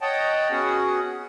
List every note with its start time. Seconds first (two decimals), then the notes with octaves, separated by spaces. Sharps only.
0.01 C#5 D#5 F#5 G5 A5
0.51 B3 C#4 F#4 G#4 F#5